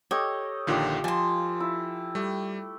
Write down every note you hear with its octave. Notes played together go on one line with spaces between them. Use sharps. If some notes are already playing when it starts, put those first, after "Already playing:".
G4 A4 C#5 D#5
A#1 D3 D#3 F4 G4
F3 G#5 A5 C6
E4
G3 A3